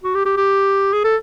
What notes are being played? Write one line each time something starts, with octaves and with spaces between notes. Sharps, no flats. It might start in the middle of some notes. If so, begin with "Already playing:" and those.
F#4
G4
G4
G4
G#4
A4